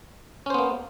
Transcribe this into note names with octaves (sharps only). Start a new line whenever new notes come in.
A#3 B3 C#4 C5